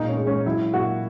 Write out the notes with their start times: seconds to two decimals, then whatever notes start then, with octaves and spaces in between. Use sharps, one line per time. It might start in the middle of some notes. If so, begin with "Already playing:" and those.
Already playing: A#2 G#3 D#4
0.08 C#4
0.17 G#3
0.27 C#4
0.46 F#3 E4
0.73 A#2 F#4